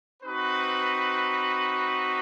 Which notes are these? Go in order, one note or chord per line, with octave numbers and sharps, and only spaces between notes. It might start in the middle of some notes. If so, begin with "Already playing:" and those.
C4 D#4 F#4 B4